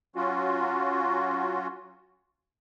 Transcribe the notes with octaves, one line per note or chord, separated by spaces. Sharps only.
F#3 C#4 F4 F#4